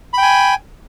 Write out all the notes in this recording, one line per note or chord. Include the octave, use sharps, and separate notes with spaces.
G5 G#5 B5